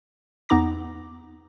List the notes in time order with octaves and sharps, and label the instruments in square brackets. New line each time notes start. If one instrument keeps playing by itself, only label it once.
[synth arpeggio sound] E2 B3 D#4 A#5 D6 A#6